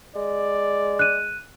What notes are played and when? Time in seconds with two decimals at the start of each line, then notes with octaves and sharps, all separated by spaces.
0.16 G#3 D5
0.99 F#6 D#7